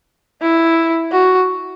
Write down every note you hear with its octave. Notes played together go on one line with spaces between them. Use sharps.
E4
F#4